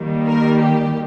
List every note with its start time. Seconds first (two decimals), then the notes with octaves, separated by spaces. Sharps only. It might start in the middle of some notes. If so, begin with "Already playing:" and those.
Already playing: D#3 G3 A#3
0.26 A#4
0.60 G4